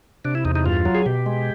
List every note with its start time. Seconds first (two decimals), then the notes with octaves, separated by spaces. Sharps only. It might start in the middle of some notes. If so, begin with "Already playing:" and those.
0.25 C3 D4
0.35 E4
0.45 E2 D#4
0.55 D#4
0.66 G2 F4
0.85 F#3
0.95 G#4
1.06 B2 G4
1.26 G#3